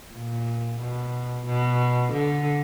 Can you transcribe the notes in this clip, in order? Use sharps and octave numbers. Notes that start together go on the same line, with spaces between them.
A#2
B2
B2
D3